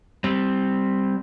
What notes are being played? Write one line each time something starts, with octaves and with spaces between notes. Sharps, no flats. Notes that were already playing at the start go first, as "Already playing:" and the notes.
G3 C4